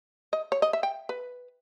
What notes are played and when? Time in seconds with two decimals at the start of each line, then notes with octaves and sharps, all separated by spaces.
0.33 D#5
0.52 C#5
0.62 D#5
0.73 E5
0.83 G5
1.09 B4